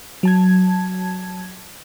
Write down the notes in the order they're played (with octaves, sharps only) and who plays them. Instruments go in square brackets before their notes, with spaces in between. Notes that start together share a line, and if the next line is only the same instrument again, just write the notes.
[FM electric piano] F#3 A5 G#6